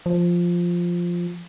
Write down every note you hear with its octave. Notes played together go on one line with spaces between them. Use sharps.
F3